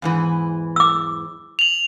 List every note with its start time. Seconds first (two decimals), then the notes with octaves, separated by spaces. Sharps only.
0.02 E2 G#2 E3
0.76 D6 E6
1.59 F7 F#7